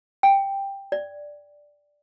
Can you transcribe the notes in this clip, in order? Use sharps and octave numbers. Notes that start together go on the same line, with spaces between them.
G5
D5